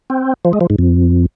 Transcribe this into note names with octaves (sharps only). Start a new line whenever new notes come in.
C4
F3
G#3
F3
G#2
F2